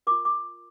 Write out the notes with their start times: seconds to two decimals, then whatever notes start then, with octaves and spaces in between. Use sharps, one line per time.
0.07 A#4 D6
0.11 F4
0.25 D6